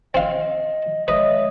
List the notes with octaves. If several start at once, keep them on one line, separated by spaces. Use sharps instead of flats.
C4 D#5 F5
G#3 B4 C#5 D#5 E5